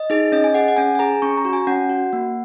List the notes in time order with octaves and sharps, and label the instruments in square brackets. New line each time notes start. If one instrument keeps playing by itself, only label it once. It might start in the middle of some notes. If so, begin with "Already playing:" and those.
Already playing: [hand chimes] D#5
D#4 G#4
C#4 D#5
G#5
G#4 F#5
F#5
C#4 G#5
G#5
G#4 A#5
C#4 C#6
A#5
F#4
G#5
C#4 F#5
F#4
A#3